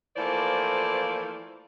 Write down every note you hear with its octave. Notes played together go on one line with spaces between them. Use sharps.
E3 F3 A3 A#3 C5 D5